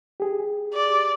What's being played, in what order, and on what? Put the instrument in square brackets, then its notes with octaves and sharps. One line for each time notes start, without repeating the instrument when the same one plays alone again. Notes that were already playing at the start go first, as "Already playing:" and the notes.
[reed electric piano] G4 G#4
[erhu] D5